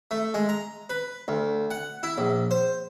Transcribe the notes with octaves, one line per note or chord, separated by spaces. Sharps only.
A3
G#3
A#5
B4
D2
F#5
E4
A#1
C5